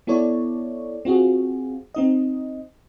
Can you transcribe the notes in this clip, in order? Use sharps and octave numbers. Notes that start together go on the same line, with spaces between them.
B3 E4 A4 C#5 D5
C4 F4 F#4 G#4
C4 D#4 D#5